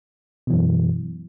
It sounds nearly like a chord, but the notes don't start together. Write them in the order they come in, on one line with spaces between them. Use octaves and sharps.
B2 E3 F#2